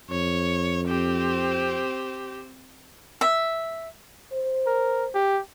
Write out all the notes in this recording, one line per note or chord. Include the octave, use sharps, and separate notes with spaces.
F2 C#5
C4 G4 C5
E5
C5
A#4
G4